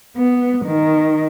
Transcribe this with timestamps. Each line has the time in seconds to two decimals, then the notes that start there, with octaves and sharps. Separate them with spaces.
0.17 B3
0.67 D#3